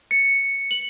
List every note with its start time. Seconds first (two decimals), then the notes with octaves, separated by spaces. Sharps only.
0.11 C#7
0.71 F#7